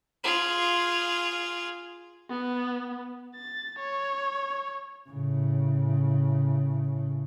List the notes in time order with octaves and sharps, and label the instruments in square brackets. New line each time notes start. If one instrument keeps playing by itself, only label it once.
[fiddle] F4 G#4
[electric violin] B3
A6
C#5
[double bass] A2 C#3